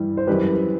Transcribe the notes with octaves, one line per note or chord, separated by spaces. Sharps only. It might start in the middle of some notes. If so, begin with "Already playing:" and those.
Already playing: G2 E3 G3 E4
C5
F#2 E3 G3 G4 B4